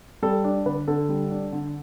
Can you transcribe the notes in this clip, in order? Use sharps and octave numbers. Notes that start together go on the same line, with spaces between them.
G3 A4
D4
D3 B4
D3 A4
G3
D4
D3